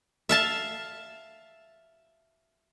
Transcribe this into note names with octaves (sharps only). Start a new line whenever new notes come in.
E5 F5 A5